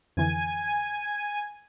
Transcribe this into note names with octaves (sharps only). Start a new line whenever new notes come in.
F2 D3 E3 G#5